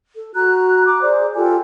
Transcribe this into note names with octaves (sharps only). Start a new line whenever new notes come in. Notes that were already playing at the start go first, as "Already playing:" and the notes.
A4
F#4 A#5 F#6
A#5 D6
G#4 C5 D5
F4 G4 A4 G#5